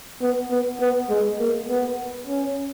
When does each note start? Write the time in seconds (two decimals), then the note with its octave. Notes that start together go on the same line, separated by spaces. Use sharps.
0.21 B3
0.51 B3
0.81 B3
1.10 G#3
1.39 A#3
1.68 B3
2.27 C#4